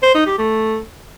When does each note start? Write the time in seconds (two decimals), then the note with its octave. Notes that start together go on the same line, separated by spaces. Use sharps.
0.03 C5
0.15 D#4
0.27 G4
0.39 A3